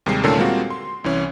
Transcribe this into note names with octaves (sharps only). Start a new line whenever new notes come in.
D#2 C3 G3 G#3 C7
A#2 D3 D#3 A3 C#4 A4
G3 G#3 A#3 C4 F4 F#4
C6
C2 E3 C#4